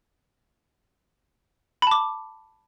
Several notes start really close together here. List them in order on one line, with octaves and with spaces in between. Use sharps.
B5 A5 D6